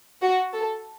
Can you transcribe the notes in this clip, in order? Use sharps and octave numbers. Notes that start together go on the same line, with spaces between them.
F#4
A4